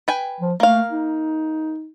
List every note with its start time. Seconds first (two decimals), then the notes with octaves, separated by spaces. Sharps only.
0.08 B4 G5 G#5
0.41 F3
0.60 A3 A#3 F5
0.90 D#4